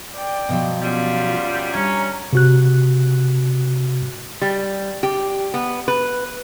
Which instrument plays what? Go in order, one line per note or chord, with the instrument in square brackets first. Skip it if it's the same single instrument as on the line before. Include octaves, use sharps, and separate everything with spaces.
[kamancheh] D5 G5
[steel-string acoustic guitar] B2 F3 F#3
[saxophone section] F#2 G3 [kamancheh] F4
[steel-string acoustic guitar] G3 D4 E4 [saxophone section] C#4 [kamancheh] A#5
[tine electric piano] C3 F#4 F#6
[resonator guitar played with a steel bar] G3
G4
B3
B4